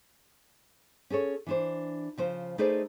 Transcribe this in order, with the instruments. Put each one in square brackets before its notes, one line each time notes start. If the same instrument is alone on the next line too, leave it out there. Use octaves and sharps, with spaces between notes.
[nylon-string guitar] C#4 G#4 A4 C#5
E3 D4 C5
C#3 F3 C5
A3 D#4 G#4 B4 C5 D5